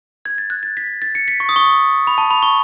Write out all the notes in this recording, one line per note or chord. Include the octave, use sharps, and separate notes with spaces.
G#6
A6
F#6
A6
B6
A6
C#7
B6
C#6
D#6
C#6
B5
A5
B5
C#6